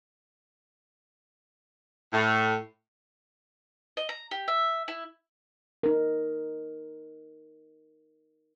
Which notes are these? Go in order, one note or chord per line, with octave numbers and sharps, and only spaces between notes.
A2
D#5
A#5
G4
E5
E4
D#4 A#4